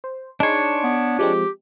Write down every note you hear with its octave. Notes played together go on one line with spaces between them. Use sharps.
C5
D4 D#4 G#4 C#5 C6
B3
F3 G#3 C4 G4